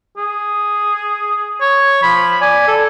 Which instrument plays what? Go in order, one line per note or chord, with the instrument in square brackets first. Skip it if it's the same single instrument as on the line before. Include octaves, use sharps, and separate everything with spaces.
[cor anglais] G#4
[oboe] C#5
[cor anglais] F3 [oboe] B5
[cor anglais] D5 [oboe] G#5
[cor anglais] A4